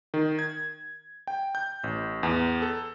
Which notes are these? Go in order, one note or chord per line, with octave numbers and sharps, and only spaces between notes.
D#3
G#6
G5
G6
A1
E2
A4